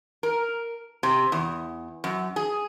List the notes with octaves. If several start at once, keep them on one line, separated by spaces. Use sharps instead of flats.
A#4
C3
E2
F#2
G#4